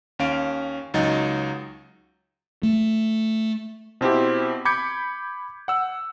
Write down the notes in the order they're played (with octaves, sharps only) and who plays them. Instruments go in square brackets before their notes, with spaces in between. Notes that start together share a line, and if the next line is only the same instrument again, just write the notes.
[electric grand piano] D#2 C#4 F5 D7
C#2 F#3 D#4 A6
[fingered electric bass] A3
[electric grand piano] B2 C4 E4 G4
B5 D6 G6 G#6 B6 C#7
F#5 E6